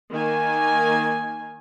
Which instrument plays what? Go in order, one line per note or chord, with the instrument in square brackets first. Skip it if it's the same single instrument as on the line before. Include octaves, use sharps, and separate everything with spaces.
[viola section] D#3 A#3 G#5